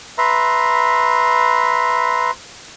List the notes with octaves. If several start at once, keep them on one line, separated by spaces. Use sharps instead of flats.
B4 E5 A#5 C6